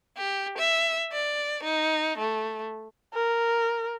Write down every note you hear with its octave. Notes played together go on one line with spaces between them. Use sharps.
G4
E5
D5
D#4
A3
A#4